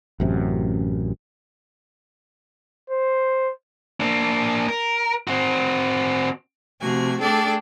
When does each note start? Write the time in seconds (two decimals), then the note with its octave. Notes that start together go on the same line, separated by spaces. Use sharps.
0.20 A1 F#2 C3
2.90 C5
4.00 A#3 D4
4.69 A#4
5.27 C4 F#4
6.81 C3 F3 A3 F#4 G#5
7.20 A3 D4 G#4 A4 D5 G5